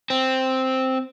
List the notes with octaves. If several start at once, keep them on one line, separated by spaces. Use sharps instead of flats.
C4